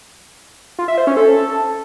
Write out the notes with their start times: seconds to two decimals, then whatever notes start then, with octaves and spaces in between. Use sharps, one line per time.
0.79 F4
0.88 E5
0.98 C5
1.07 C#4
1.17 A4